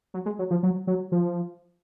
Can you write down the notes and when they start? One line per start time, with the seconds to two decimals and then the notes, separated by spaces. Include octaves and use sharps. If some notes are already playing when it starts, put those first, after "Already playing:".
0.14 F#3
0.26 G#3
0.39 F#3
0.51 F3
0.63 F#3
0.87 F#3
1.12 F3